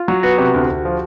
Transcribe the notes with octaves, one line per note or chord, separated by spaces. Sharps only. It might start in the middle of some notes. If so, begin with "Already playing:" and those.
Already playing: F4
F#3 F#4
B3 F#4
C3 G4
D2
D2
F3